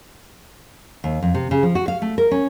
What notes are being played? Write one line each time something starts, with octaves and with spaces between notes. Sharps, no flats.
D#2
F2
C3
C#3
F3
F#4
F5
A3
A#4
C#4